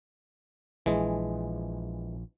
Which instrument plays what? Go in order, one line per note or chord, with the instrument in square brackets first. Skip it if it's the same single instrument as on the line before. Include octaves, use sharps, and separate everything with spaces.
[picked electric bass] A#1 [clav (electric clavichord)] E3 G#3